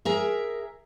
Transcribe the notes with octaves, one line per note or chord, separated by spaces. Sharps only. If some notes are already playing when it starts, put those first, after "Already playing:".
G#4 A#4 E5